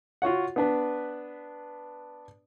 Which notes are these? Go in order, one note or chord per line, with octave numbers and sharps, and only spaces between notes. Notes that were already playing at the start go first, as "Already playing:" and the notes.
F4 F#4 C#5 F#5
B3 D4 B4